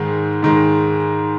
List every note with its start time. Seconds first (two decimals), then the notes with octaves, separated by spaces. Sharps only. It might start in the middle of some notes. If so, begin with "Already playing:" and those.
Already playing: G#2 D#3 G#3
0.42 G#2 D#3 G#3